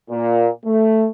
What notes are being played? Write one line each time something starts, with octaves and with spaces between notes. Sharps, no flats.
A#2
A3